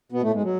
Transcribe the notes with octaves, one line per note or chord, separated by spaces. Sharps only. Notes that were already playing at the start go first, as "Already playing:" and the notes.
B2 B3
A2 A3
G#2 G#3
F#3